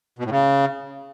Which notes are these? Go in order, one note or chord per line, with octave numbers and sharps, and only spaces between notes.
B2
A2
C#3